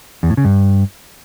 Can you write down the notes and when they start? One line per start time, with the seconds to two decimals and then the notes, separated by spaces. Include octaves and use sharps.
0.23 E2
0.30 A2
0.37 C#3
0.45 G2